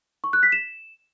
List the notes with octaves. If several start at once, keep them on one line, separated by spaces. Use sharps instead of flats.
C#6
F#6
B6
E7